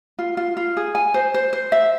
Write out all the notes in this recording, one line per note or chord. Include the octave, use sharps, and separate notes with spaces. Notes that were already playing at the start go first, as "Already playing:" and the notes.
F4
F4
F4
G#4
G#5
C5
C5
C5
E5